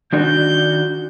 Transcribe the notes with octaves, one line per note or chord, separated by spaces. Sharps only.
D#3 D4 F#4 G6